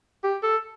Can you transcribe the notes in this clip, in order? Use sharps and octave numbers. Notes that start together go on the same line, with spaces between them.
G4
A4